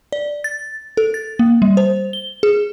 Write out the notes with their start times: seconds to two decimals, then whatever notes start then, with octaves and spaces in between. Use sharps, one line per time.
0.12 D5
0.44 A6
0.97 A4
1.14 A6
1.39 A#3
1.62 G3
1.77 C5
2.13 G7
2.43 G#4